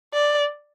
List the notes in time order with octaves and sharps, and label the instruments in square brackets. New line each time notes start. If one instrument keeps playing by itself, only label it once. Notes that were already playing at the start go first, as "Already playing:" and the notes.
[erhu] D5